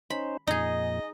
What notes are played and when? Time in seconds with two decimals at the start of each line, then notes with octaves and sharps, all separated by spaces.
0.10 C#4 D#4 C5 B5
0.47 F2 A#2 D#4 G#4 D#5